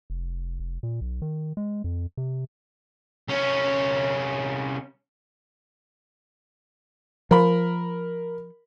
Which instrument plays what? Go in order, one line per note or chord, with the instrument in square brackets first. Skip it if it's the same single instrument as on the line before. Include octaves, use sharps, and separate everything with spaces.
[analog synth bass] F1
F1
A#2
B1
D#3
G#3
F2
C3
[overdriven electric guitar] C2 C#4
[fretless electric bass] F3 [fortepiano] A#4 B5